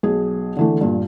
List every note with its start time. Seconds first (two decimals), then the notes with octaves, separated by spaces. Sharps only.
0.03 B1 G#4
0.56 D3 E3 A3
0.81 G2 A#2